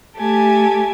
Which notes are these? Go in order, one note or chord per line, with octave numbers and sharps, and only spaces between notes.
A3 G4 G#5 A5